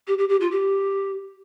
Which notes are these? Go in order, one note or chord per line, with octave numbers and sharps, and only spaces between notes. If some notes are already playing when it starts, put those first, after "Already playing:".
G4
G4
G4
F4
G4